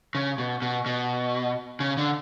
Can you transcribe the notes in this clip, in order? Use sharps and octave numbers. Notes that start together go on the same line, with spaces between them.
C#3
B2
B2
B2
C#3
D3